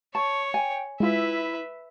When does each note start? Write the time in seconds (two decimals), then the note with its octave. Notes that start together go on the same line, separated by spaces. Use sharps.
0.15 C#5 A5 C#6 E7
0.54 G5 G#5
1.00 G#3 E4 F4 B4 E5